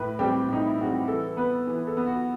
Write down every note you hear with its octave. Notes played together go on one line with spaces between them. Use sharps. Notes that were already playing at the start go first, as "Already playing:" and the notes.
Already playing: A2 B4
G3 C4 G4
A2 D#4
E4
G3 C4 F#4
G4
E3 A4
B3 B4
E3
A4
B3
F#4